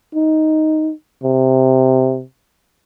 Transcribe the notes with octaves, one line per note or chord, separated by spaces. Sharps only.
D#4
C3